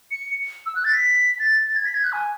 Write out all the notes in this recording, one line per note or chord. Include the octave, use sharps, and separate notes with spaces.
C#7
E6
F#6
A6
B6
A6
A6
G#6
B6
G#6
F#6
G#5